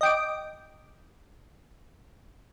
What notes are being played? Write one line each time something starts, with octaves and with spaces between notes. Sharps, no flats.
D#5 G5 D6